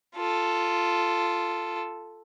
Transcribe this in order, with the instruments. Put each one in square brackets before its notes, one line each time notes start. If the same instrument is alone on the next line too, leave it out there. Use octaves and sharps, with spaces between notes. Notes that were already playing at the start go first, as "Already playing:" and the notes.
[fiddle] F4 A4